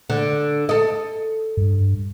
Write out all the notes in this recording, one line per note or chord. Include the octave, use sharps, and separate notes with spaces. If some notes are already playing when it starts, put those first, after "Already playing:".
D3
A4 D#5
G2